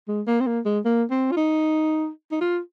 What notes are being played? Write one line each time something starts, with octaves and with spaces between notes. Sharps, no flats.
G#3
A#3
C4
A#3
G#3
A#3
C4
F4
D#4
D#4
F4